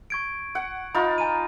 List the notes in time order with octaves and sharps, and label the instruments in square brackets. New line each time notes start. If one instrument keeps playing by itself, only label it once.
[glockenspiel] C#6 G#6 D7
[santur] F#5
[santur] D#4 F4 [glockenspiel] B5
[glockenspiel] G#5 A#5 D#7